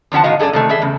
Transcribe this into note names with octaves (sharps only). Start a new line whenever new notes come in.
E2 D3 F3 F#5 A5
A2 D#3 F#4 D#5 F5
F#2 G#4 A4 D5 G#5
C3 D#3 A3
E3 G#4 A4 E5
E2 C#3